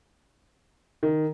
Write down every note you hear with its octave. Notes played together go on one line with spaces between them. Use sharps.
D#3